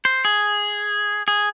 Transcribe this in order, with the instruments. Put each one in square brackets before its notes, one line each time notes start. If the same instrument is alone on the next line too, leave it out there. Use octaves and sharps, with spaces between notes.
[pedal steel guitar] C5
G#4
G#4